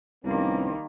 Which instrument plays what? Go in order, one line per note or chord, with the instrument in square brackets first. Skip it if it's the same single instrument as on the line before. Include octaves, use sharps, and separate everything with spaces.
[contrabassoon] C2 [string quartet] D#3 G3 A#3 [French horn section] F3 B3 C#4